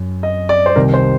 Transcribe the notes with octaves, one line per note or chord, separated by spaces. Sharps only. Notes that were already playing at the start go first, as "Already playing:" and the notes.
Already playing: F#2
D#5
D5
C5
C2 C3 D#3 A#4
C5